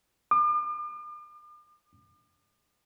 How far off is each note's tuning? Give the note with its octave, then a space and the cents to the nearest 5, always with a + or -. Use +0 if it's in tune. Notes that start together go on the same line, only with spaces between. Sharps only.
D6 +45